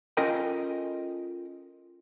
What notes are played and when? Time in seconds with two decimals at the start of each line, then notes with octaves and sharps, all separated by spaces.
0.17 C#4 F4 A4 A#4 D#5 G5